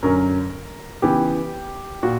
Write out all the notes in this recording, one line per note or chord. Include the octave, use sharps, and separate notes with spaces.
F#2 D3 F#3 C#4 A#4
C#3 E3 B3 G4
A#2 F#4